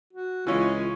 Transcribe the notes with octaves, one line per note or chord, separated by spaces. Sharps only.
F#4
C#2 E3 G#3 C#4 F4